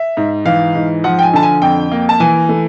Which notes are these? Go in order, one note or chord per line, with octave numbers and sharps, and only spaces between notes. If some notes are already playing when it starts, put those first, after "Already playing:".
Already playing: E5
G#2
E3 F5
G#2
F3 F#5
G5
G#5
D3 A5
G#5
F2 G5
A#3
A5
E3 G#5
A3